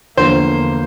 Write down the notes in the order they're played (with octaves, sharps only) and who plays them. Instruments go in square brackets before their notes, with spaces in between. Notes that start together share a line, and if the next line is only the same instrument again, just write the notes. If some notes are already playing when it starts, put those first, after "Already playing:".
[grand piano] E2 D3 F3 [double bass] A#3 [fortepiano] C5